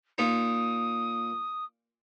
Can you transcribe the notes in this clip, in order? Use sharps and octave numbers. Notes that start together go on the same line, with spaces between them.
A#2 D#4 D#6